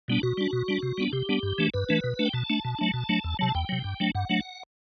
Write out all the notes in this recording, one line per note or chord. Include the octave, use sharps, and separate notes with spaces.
B2 G3 B3 D4
B2 F#4
G3 D4
B2
G3 D4
C3
G3 B3 D4
C3 G4
G3 B3 D4
G2
E3 A3 D4
G2 B4
E3 A3 D4
B2
A3 D4
G5
B2 A5
A3 D4
B2
F#3 A3 D4
B2
F#3 A3 D4
E2
C3 F#3 A5
E2 G5
C3 F#3
G2
F#3 A3 D4
G2 F#5
F#3 A3 D4